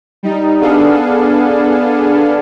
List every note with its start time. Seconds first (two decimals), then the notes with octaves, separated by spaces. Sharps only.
0.23 G3 D#4
0.61 B3 D4 G#4 A4 F5